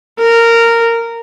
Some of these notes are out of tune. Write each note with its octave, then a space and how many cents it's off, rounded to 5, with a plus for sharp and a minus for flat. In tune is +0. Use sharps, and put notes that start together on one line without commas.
A#4 -10